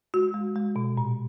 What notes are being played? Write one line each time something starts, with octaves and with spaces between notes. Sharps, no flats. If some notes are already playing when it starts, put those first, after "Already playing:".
G#3 F#4
G#3
G#3
B2
A#2